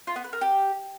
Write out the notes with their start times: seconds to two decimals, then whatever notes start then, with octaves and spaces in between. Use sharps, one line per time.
0.07 F4
0.16 B3
0.24 B4
0.33 A#4
0.41 G4